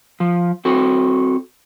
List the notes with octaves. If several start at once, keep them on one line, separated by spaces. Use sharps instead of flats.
F3
C4 F#4 A4